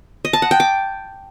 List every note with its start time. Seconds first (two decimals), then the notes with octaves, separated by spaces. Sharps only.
0.25 D#5
0.33 A5
0.42 F#5
0.51 G5
0.60 D6